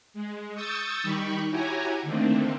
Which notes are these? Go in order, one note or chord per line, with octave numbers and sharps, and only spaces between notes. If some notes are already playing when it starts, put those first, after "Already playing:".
G#3
C#6 D#6 E6 G6 A6 C#7
D#3 G3 D#4 G4 B5 C#6
E4 F#4 G4 C#5 G#5 A#5
D3 D#3 A3 A#3 C4